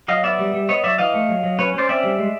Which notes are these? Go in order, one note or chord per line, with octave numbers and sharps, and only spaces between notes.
F#3 D#5 F5
B3 D5 E5
G3
G3
B3 C#5 D#5
F#3 D5 E5
E3 D#5 F5
A3
F#3
F#3
C#4 B4 C#5
C#4 C5 D5
C4 D5 E5
G3
G#3